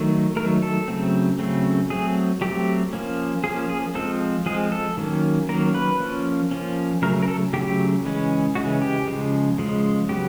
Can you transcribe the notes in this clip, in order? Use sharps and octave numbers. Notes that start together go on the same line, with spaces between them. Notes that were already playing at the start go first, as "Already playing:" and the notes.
Already playing: D#3 F#3 A3
D#3 F#3 A3 A#4
A4
C#3 F#3 A3 C4
C#3 F#3 A3 C4
F#3 A3 C4 G#4
F#3 A3 C4 G4
F3 A#3 C#4
F3 A#3 C#4 G#4
G#4
F3 G#3 C4 A4
F3 G#3 C4 G#4
A4
D#3 F#3 A#3 C#4
D#3 F#3 A#3 C#4 A#4
B4
F3 A#3 C#4
F3 A#3 C#4
C#3 F#3 A3 A#4
A#4
A4
C#3 F#3 A3 G4
C#3 E3 G#3 C#4
C#3 E3 G#3 C#4 F#4
G4
C#3 F3 G#3
C#3 F3 G#3
C#3 F#3 B3 G4